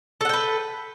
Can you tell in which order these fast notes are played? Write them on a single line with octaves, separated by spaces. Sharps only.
A4 F#5 G5 B4